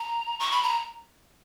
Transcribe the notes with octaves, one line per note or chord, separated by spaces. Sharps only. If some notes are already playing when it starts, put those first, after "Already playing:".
Already playing: A#5
C#6
B5
A#5